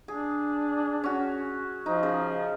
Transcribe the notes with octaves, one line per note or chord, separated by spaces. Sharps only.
D4 G#4
C#4 F#4
F3 D#4
C#3